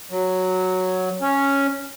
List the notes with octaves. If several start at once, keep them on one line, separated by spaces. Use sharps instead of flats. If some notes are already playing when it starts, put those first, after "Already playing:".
F#3
C#4